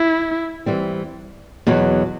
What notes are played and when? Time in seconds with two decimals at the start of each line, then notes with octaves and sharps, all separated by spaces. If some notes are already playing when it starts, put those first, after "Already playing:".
Already playing: E4
0.66 E3 G3 C4
1.67 E2 B2 F#3